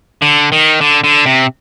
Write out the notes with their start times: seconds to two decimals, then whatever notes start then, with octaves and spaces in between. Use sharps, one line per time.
0.22 D3
0.52 D#3
0.81 D3
1.04 D3
1.26 C3